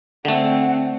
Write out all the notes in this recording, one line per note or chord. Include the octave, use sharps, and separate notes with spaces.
D3 A3 C4 F#5